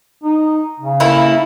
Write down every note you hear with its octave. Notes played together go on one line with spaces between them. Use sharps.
D#4
C#3
A#3 E4 A4